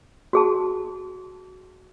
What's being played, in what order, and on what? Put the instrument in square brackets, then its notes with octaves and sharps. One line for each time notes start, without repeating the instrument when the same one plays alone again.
[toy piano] F#4 G#4 A5